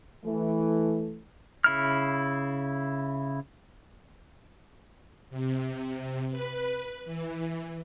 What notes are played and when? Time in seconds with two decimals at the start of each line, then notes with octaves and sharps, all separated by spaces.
0.25 E3 A3
1.64 C#3 E4 F6
5.30 C3
6.30 B4
7.05 E3